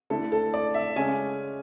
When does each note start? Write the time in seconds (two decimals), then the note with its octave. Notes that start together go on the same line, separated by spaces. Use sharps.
0.10 D3 A3 E4 A4
0.32 A4
0.54 D5
0.74 E5
0.96 C#3 G#3 C#4 G#5